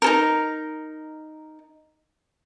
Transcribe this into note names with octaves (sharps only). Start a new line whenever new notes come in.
D#4 A4 A#4